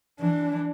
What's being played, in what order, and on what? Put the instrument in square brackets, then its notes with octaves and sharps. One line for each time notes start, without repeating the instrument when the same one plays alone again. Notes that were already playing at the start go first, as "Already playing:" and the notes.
[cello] E3 [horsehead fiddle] D4